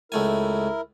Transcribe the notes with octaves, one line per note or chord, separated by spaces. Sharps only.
C#2 A3 E4 A#4 G#5